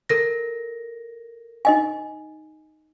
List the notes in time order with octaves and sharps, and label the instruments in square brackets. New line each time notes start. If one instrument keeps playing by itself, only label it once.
[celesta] A4 A#4 A#6
[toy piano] D#4 D#5 G#5